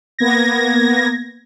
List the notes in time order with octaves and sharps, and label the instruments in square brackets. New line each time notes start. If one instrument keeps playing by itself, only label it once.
[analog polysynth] A#3 B3 G#6 A#6